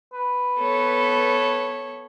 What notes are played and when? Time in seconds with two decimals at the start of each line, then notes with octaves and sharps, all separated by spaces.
0.14 B4
0.58 B3 A4 C#5